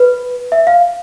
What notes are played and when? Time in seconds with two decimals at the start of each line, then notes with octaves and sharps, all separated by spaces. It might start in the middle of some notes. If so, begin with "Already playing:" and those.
Already playing: B4
0.52 E5
0.67 F5